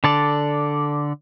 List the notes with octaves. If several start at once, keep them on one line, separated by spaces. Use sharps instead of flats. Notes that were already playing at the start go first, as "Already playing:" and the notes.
D3 A4 D5